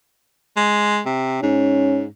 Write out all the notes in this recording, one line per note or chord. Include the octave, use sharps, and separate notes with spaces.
G#3
C3
G#2 C#4